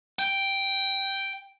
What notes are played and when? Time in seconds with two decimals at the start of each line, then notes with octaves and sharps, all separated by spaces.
0.19 G5